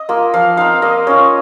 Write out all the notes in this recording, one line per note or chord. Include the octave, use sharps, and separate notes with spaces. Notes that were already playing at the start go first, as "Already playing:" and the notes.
Already playing: D#5
A#3 F4
F3 F5
C4 D#4 F5
A#3 D#5
C#4 F4 C#5